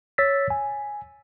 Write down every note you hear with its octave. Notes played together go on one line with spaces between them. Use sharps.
C#5 E6 A6 B6
G#5